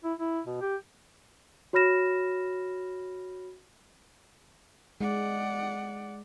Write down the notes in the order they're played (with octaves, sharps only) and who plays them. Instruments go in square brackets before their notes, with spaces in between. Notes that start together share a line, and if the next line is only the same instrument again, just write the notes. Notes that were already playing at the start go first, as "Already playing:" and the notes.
[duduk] E4
E4
B2
G4
[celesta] F#4 C#5 B5 F6 A#6 E7
[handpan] G#3 [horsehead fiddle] D5 F#5